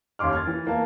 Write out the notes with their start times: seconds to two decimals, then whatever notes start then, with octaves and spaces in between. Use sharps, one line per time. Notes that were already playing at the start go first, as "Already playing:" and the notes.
0.19 D#2 C#4 C6 D6 F6
0.33 F6 G#6 A6
0.47 E3
0.66 E3 A#3 B3 A5